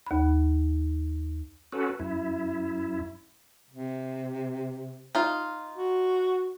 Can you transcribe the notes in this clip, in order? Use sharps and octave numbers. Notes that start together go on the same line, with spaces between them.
D#2 B5
C#4 F#4 A4 B4
F#2 E4
C3
D#4 F4
F#4